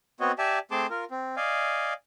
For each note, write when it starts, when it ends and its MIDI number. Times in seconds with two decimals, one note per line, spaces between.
0.20 0.32 59
0.20 0.32 60
0.20 0.32 66
0.20 0.32 73
0.20 0.32 75
0.38 0.59 67
0.38 0.59 74
0.38 0.59 76
0.38 0.59 80
0.38 0.59 81
0.71 0.87 57
0.71 0.87 60
0.71 0.87 68
0.71 0.87 81
0.71 0.87 84
0.71 0.87 86
0.90 1.05 65
0.90 1.05 70
1.11 1.35 60
1.36 1.93 74
1.36 1.93 75
1.36 1.93 77
1.36 1.93 80